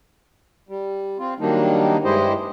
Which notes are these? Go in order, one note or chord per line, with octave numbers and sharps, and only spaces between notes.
G3
C4 F4
D#3 F#3 G3 A#3 D4 D#4
G2 G#3 E4 G4 C5 D#5